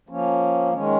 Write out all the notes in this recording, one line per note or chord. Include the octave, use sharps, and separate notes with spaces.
F3 A#3 C#4
D#3 G#3 C#4